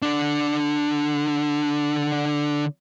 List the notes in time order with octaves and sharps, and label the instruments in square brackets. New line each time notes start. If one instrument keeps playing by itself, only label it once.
[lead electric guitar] D3 D4